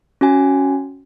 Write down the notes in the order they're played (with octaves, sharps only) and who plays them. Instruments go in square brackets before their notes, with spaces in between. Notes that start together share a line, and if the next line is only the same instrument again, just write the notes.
[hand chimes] C#4 F#4 G#5